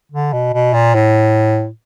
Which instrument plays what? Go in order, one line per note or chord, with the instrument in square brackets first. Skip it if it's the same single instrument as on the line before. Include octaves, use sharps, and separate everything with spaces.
[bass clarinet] D3
B2
B2
A#2
A2